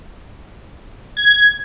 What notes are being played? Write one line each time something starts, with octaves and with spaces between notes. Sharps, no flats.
G#6